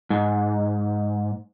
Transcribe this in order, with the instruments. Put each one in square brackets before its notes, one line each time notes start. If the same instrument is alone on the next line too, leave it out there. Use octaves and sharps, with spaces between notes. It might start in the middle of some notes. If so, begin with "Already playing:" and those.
[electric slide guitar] G#2